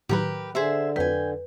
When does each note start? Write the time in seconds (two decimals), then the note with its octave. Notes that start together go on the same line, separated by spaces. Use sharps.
0.09 A2 D#3 F#3 G4 A#4 B4
0.55 D3 G#4 C5 E5
0.96 F2 F#3 B4 G5 G#5